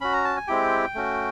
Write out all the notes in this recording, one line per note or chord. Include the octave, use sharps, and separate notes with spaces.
C#4 F#4 B5
A#5
A5
G#5
G#3 C4 E4 G4 G5
A3 C#4 F#4